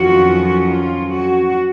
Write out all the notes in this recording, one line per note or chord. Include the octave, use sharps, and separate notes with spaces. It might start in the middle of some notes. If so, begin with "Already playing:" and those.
Already playing: F2 D#3 F#3 C#4 F4 F#4
F4
F#4